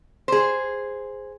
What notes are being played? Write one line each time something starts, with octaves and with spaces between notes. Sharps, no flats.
G#4 C5